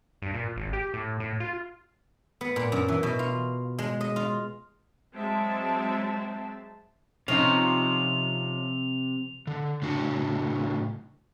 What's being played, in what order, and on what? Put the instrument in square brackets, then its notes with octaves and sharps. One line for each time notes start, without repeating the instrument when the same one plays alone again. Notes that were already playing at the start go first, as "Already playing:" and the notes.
[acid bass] G2
A#2
G#1
G4
A2
A2
F4
[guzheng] B3
A#2
F#2
E3
B2
F4
G#3
D#5
F4
[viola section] F#3 G#3 C4 E5 A5
[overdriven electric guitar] C3 [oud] F3 [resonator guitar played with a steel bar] C#4 D#4 [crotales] F7
[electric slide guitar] D3
A2 C#3 D4 F#4